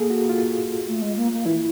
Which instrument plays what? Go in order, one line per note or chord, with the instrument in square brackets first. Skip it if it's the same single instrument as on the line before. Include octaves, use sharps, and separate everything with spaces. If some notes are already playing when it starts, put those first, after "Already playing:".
Already playing: [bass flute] A#3 [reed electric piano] G#4 A4
[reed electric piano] F#4
F4
[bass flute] A3
G#3
A#3
A#3
[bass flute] E3 [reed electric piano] E4